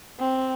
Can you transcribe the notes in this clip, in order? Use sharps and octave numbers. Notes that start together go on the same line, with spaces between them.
C4